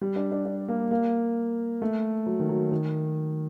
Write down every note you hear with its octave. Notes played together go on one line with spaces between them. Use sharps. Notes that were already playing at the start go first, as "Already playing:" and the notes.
G3
D4
D4
D4
A#3
A#3
A3
F#3
D#3
F#3
D#3